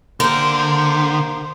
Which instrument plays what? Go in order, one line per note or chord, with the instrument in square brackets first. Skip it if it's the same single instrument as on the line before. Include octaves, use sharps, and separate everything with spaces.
[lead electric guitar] D3 [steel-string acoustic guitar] A#3 G4 [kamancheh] C5